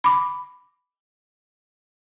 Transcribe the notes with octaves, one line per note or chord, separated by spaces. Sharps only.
B5 D6